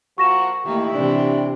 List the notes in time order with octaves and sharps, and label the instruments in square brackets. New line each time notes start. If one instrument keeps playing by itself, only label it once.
[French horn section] F3 A#3 F#4 [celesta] C#6 A#6 E7
[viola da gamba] D#3 A3 A#3 [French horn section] E4 G4
[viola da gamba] C3 E3 [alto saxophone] D4